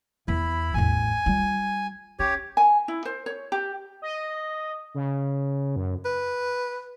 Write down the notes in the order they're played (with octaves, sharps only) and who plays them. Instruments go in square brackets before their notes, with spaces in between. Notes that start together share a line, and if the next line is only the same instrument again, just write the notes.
[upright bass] E2 B3 [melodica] E4 B5
[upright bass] A1 E2 [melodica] G#5
[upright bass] G3 F4
[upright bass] C#4 [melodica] G4 C#5
[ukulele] G#5
E4
C5
C#5
G4
[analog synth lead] D#5
C#3
F#2
[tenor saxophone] B4